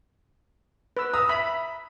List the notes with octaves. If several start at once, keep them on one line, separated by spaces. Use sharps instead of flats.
B4 E6
A#5 D#6 E6
E5 B5